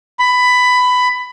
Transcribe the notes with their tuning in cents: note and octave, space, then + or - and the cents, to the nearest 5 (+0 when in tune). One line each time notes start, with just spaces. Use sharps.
B5 +15